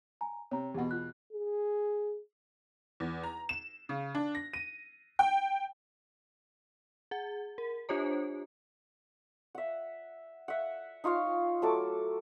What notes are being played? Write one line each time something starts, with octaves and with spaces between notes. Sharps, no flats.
G#5 A#5
C3 C#5 A#5
E2 B2 G4 F#5
F4 F#6
G#4
E2
A#5
E7
C#3
D4
A#6
D#7
G5
G#4 F#5
A#4
D4 F4 G4 C5 C#5 A#5
E5 F#5
E5 F#5
D#4 F4 C#5 F5
F#3 A3 A4 D6